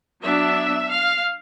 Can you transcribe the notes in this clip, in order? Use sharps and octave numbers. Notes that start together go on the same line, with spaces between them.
F#3 B3 D4 E5
F5